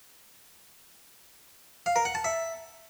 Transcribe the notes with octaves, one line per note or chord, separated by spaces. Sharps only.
F5
A#4
F#5
A5
E5